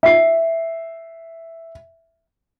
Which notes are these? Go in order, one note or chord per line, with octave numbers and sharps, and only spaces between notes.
E5 C7